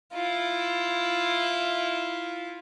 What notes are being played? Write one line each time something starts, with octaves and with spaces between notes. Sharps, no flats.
E4 F4